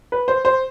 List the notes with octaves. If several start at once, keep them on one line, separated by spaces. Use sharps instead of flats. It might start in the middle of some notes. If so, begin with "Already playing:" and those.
B4
C5
C5